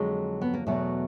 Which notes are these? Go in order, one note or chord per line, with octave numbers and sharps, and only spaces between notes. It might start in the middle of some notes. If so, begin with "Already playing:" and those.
Already playing: F2 D3 F#3 G#3
B3
A#3
E2 B2 F#3 A3